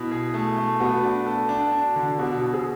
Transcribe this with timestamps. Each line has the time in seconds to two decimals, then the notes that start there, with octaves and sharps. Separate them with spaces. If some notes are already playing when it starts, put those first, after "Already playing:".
Already playing: B2 E4
0.11 G#4
0.34 A3
0.57 A3
0.80 B3 F#4
1.04 D4
1.27 A4
1.49 D4
1.72 D4
1.96 D3
2.18 B2 F#4
2.42 B2
2.54 G#4